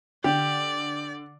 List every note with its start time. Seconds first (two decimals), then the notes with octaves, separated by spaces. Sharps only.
0.24 D3 G4 D5